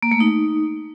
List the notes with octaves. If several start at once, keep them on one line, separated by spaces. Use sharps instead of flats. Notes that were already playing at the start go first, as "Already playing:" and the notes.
A#3
A3
D#4